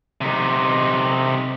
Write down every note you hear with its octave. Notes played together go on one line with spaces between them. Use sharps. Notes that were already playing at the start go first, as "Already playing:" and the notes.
C3 D#4